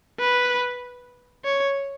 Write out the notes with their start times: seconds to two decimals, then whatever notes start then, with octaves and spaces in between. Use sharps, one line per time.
0.20 B4
1.45 C#5